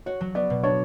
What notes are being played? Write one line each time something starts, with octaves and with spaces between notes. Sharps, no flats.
F#4 C#5
F#3
B3 D5
B2
D4 C#5